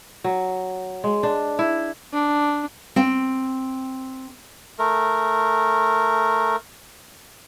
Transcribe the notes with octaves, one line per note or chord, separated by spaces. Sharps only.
F#3
G#3
D4
E4
D4
C4 G5
A3 A#4